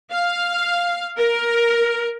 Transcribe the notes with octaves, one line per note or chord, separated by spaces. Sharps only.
F5
A#4